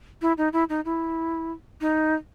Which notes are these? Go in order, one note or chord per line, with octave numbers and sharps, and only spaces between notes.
E4
D#4
E4
D#4
E4
D#4